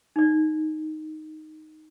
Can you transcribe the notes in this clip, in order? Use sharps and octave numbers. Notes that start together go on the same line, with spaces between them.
D#4 D5